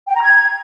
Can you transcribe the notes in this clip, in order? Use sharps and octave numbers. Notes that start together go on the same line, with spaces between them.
G5
A#5
G#6